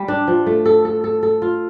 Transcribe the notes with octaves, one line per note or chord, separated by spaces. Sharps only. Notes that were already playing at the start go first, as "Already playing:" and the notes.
Already playing: G3
D4
F3
A3
A4
A4
A4
A4
F4